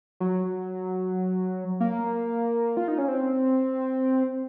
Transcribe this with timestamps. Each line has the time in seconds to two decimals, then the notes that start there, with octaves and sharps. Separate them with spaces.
0.20 F#3
1.80 A#3
2.77 F4
2.88 D#4
2.98 C#4
3.08 C4